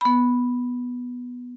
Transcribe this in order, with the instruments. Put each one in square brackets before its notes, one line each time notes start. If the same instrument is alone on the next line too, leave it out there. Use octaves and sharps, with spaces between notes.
[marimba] B3 B5